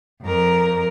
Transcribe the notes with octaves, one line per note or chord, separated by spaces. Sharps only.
F2 A#4